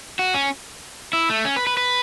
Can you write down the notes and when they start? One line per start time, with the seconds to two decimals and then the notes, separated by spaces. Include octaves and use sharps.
0.19 F#4
0.34 C#4
1.13 E4
1.30 A3
1.45 C#4
1.56 B4
1.67 B4
1.77 B4